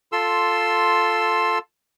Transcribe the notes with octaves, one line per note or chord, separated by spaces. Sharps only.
F4 A4 C6 E6